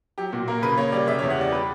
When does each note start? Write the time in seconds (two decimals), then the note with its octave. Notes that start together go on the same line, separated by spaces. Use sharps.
0.18 F#3 G4
0.33 A#2 F#4
0.48 A#3 A#4
0.62 C#3 B4
0.77 A#3 C#5
0.92 G3 D5
1.07 C#3 E5
1.18 C#5
1.22 E2
1.30 F#5
1.38 G3 D5
1.52 G3 B4